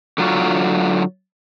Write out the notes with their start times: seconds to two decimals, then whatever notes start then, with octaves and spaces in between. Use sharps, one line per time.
0.18 D3 F#3 F4 C#5